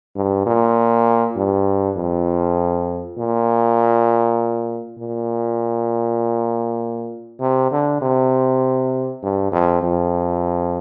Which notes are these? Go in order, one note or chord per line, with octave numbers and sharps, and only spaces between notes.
G2
A#2
G2
F2
A#2
A#2
C3
D3
C3
G2
F2
F2